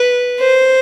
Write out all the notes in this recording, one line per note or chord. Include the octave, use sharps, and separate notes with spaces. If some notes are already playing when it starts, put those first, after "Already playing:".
Already playing: B4
C5